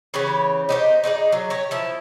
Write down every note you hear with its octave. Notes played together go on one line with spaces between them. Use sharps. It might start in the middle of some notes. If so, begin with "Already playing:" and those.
C#3 E3 G4 C#5
D#4 G4 C5
D#4 G#4 C5 D5
F#3
G4 C#5
F3 E4 A5